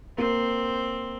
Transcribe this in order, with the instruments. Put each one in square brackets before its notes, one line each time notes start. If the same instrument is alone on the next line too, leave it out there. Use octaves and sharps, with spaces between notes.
[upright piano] A#3 [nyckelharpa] C4